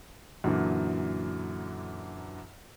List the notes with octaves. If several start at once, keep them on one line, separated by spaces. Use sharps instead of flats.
F#2 A#2 D3 E3